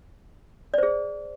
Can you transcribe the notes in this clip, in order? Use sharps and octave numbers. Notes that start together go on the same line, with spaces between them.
G#4 C5 D5